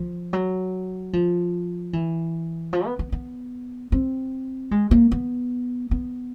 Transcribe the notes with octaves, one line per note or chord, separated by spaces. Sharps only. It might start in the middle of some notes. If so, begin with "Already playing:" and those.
Already playing: F3
F#3
F3
E3
F3
B3
B3
B3
C4
G#3
A#3
B3
B3